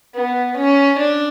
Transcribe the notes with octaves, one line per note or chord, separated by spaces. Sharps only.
B3
C#4
D4